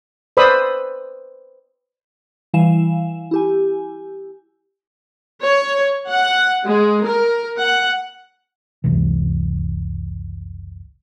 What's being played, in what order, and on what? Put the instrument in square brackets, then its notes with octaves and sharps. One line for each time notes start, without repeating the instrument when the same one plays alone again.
[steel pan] B4 C5 D5 B5 D#6 E6
[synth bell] E3 G3 E4 F5 G#5 E7
E4 G4 G#5
[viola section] C#5
F#5
G#3
A#4
F#5
[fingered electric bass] F#1 C#2 C3 E3